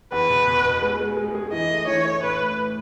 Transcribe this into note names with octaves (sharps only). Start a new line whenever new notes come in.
E2 B4
B2
B2
B2
G#3
G#3
G#3
G#4
E3 D#5
A3
E3 C#5
A3
A2 B4
A2
A2